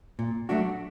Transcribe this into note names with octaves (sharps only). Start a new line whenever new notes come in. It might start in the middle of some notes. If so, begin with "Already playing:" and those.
A#2
F#3 A3 D4 F#4